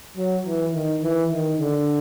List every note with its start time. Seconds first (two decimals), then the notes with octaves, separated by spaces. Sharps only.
0.17 F#3
0.45 E3
0.74 D#3
1.03 E3
1.31 D#3
1.59 D3